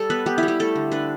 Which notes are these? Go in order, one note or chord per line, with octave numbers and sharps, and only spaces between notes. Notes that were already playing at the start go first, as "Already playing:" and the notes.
Already playing: G3 A4
B3 B4
B3 G4
G3 E4
G4
A3 A4
D3
D4 B4